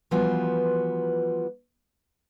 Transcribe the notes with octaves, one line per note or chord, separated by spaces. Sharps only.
E3 F3 G3 B3 F4 F#4